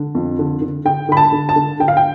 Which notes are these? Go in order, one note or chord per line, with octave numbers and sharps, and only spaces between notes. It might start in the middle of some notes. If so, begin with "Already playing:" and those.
Already playing: D3
F2
D3
D3
D3 G5
D3 B5
A5
D3
A5
D3
D3 G5
F5
G5